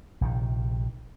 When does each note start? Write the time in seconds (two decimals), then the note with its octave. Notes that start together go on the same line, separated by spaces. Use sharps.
0.21 A#1 C3 D#3